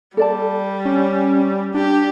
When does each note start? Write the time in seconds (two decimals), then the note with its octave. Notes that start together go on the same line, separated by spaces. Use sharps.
0.17 G3 A4 D5 A5
0.85 C#4
1.74 D4 G4